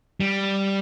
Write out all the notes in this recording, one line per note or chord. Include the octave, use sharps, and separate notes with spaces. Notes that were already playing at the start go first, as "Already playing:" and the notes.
G3